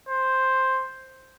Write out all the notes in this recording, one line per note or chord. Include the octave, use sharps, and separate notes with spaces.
C5